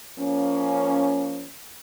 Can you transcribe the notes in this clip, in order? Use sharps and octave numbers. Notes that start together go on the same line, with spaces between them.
F3 A#3 C#4